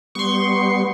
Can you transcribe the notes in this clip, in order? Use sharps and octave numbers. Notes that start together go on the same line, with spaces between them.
G3 B3 C6 C#6